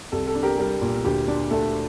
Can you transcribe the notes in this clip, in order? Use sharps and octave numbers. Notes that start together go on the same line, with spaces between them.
C2 A4
A4
D4
G4 A#4
G3 G4 A#4
A#2
D2 G4
D4
A3 A4